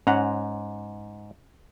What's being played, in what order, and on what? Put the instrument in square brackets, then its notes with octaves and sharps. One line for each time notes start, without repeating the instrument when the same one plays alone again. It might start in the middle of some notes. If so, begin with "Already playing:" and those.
[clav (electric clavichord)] G#2 A#5 [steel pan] C#4 F#5